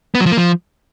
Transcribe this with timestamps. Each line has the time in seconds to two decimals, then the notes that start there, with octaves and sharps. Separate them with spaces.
0.15 B3
0.20 F#3
0.26 F3
0.32 A#3
0.37 F3